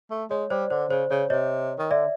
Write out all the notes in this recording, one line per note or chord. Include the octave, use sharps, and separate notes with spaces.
A3
G#3 C#5
G3 C5 D5
D3 C5
C#3 C5
C#3 C#5
C3 C#5 D#5
D#3
D3 D5 E5